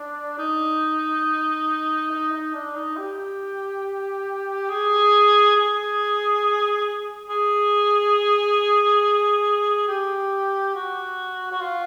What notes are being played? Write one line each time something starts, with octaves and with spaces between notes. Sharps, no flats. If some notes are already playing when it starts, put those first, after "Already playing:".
Already playing: D4
D#4
D#4
D#4
D4
D#4
G4
G#4
G#4
G#4
G4
F#4
F#4
F4